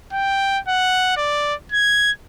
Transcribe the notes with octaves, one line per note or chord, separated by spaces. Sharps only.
G5
F#5
D5
G#6